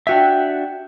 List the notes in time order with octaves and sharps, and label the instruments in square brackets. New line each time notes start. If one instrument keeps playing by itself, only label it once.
[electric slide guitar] D4 F#4 E5 [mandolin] G4 G5 G#5